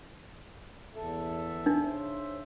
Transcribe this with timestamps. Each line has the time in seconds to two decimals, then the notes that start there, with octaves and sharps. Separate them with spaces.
0.95 E2 A4 E5
1.66 D4 D#4
1.84 C#3 C5 E5